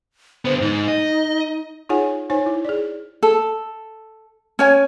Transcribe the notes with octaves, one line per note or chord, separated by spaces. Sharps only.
D3 B3 C5
G#2 D#4
D#5
D#4 F4 G#4 C#5 F#5 G#5
D#4 C5 C#5 G#5
E4
G#4 D5
A4
C#4 C#5 G#5